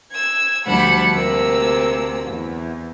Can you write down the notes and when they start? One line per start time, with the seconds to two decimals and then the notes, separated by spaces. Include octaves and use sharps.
0.12 E6 G#6
0.66 D2 F3 G3 D4 F#5 B5
1.13 D2 C3 A#3 E6
2.30 E2